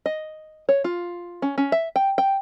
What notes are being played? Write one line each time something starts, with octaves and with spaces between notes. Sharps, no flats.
D#5
C#5
F4
C#4
C#4
E5
G5
G5